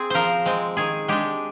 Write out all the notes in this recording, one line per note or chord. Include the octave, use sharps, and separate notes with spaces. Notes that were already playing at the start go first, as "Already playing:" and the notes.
Already playing: C4 G#4
F3 A#4 C5
G#3 C4
D#3 G#4
G#3 D4 G4